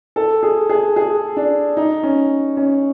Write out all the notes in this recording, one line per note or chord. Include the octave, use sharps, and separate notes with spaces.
A4
G#4
G#4
G#4
D4
D#4
C#4
C#4